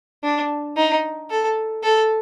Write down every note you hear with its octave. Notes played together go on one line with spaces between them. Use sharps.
D4
D#4
A4
A4